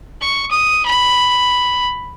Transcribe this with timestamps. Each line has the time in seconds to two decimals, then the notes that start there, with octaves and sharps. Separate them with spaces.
0.21 C#6
0.51 D#6
0.86 B5